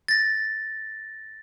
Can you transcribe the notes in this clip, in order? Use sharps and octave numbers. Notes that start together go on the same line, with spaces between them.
A6 A#6